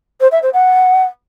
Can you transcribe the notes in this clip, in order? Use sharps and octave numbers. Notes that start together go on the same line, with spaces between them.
C5
E5
C5
F#5